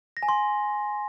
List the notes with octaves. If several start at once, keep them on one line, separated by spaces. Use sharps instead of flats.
A#6
G#5
C6